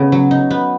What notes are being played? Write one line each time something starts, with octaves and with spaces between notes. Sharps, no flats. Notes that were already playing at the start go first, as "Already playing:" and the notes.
Already playing: C#3 A3 B3 D#4
F#3
D#4
B3